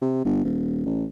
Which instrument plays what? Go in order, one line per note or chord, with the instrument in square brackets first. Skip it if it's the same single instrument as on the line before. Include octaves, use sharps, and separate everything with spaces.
[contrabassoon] C3
G1
D#1
A1